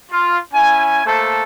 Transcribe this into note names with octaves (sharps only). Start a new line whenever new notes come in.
F4
C#4 E4 G#5
A3 A#3 A4 C5 A5